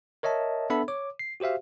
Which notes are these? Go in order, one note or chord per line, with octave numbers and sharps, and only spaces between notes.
A#4 C#5 D#5 E5 A5
B3 D4 A4 E5 B5
C#5 D6
C7
F#4 G4 C5 E5 F5